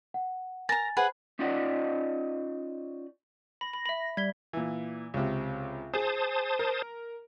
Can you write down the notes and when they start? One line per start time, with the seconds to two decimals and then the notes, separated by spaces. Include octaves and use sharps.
0.14 F#5
0.69 A#4 G#5 A#5 A6
0.97 G#4 B4 C5 F#5 B5
1.39 C#4 D#4 F4 D5 D#5 F#5
3.61 B5 A#6
3.73 B5
3.86 E5 B5
4.17 G3 G#6 B6 G7
4.53 A#2 E3
5.14 C#2 C3
5.94 G#4 C5 A5 D#6
6.59 A#4